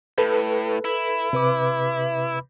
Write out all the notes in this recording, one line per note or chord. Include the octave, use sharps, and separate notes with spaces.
A2 A4 B4
E4
C3 B4 D6